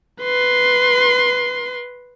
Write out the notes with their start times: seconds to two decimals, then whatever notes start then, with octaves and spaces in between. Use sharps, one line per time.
0.22 B4 C6